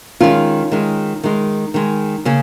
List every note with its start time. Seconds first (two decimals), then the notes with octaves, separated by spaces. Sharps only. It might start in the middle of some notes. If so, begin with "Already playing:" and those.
0.20 D#3 G#3 C#4 F4
0.72 D#3 G#3
1.24 D#3 G#3
1.74 D#3 G#3
2.25 C#3 A#3 C#4